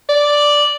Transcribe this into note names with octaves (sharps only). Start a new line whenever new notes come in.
D5